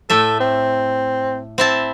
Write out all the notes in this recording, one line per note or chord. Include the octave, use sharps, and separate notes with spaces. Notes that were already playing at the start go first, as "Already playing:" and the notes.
A2 A3 A4 E5
C4
C4 E4 A5